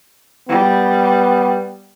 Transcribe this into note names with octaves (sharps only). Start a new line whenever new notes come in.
G3 B3